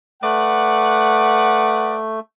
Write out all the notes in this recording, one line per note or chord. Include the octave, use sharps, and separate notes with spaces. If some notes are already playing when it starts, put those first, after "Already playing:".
A3 B4 D5 F#5